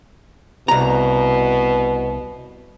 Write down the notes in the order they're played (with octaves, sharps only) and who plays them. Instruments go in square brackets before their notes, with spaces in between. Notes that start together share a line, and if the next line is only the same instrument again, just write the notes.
[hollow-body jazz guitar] C2 A#5 [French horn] B2